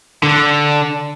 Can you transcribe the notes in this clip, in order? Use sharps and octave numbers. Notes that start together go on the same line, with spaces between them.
D3